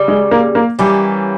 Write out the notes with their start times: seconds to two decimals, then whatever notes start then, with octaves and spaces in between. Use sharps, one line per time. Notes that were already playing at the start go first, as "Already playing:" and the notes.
Already playing: C#3 G3
0.08 G#3
0.31 A#3
0.55 A#3
0.79 E3 G3 A#3 C#4 G4